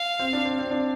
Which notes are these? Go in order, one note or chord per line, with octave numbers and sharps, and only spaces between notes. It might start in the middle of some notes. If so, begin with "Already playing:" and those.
Already playing: F5
C4
D4
C4
C4
D4